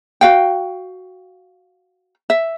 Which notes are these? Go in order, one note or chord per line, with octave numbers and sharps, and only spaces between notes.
F#4 F5 G5
E5